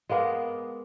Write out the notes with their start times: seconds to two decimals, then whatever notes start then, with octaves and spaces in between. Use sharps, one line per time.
0.09 G#3 A#3 B3 A#4